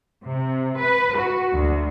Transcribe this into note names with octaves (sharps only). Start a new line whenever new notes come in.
C3
B4
F#4
D2